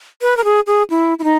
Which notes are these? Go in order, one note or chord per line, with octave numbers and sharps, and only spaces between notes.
B4
A#4
G#4
G#4
E4
E4
D#4